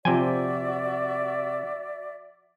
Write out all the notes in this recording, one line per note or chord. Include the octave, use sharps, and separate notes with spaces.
C3 F3 F#4 D5 E5 G5 G#5